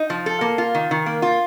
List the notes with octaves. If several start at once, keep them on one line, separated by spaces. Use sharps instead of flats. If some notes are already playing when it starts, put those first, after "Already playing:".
Already playing: D#4
F3
A4
A#3
F4
D#3
D#3
A#3
F4